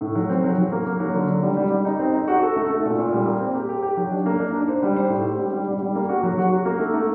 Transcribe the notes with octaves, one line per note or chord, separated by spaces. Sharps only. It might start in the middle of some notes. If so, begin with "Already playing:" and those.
A2
F#3
C4
F#3
F#3
A#3
A#3
F#3
D3
D3
G3
G3
G3
D#4
C4
D#4
F#4
A4
A3
A3
A#2
A#2
G3
A#3
C4
G4
G4
G4
F#3
D4
A#3
D4
D4
C5
G3
C5
A2
G4
G3
G3
G3
G3
A#3
F#4
F#3
F#4
F#4
A#3
A3
A3